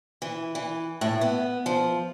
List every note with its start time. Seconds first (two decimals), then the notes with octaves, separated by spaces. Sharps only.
0.22 E3
0.55 E3
1.01 A2
1.21 B3
1.66 F3